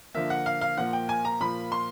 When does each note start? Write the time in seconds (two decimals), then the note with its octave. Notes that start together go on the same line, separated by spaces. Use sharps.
0.14 D3 F3 A#3 E5
0.30 F#5
0.46 F5
0.61 F5
0.77 A#2 F3 A#3 F#5
0.93 G5
1.09 G#5
1.25 A#5
1.41 A#2 F3 A#3 B5
1.72 C6